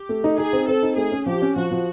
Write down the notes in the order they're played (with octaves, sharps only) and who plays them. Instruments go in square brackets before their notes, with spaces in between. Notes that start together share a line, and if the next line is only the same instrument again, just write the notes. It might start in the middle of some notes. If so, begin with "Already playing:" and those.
Already playing: [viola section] G4
[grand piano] A3
D#4
[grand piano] D#4 [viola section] G#4
[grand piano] C4
[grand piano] C4 [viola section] A4
[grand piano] D#4
[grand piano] A3 [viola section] G#4
[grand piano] C#4
[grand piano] F3 [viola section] G4
[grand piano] C#4
[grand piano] F3 [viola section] F#4
[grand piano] F3